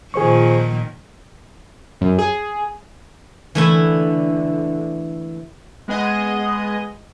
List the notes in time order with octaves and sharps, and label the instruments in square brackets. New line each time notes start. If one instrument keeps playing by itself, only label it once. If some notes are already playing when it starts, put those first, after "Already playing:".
[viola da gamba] A#2 D#3 F3 [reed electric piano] G#4 C5 C#6
[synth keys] F#2
G#4
[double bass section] D3 [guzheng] E3 A3 E4
[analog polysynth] G#3 B3 G#4 D#5